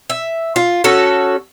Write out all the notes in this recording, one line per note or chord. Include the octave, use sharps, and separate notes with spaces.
E5
F4
C#4 F#4 A4